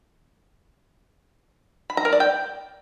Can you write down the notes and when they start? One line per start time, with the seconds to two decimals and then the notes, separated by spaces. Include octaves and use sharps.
1.90 B5
1.97 A#5
2.05 A#4
2.13 D5
2.20 G5